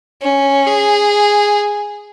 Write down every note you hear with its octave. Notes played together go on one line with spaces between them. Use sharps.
C#4
G#4